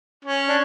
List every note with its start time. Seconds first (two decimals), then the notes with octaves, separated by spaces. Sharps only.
0.25 C#4
0.49 D4